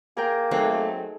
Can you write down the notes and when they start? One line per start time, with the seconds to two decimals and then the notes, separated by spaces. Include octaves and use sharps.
0.17 A#3 G#4 A#4 G5
0.51 F#3 A3 C4 D#4 G#4 A4